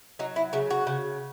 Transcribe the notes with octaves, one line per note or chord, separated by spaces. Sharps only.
F#3 D#4
E4
C#3 F#4
F#4
C#3